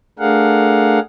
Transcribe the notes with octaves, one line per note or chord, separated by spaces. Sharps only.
A3 D4 G#4 A#4 F5 F#5